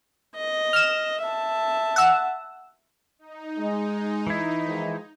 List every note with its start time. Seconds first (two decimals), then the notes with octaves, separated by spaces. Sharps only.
0.36 D#5
0.73 F6 E7
1.21 E5 A5
1.96 F#5 E6
3.19 D#4
3.58 G#3
4.27 E3 E4
4.65 D#3 F3 G#3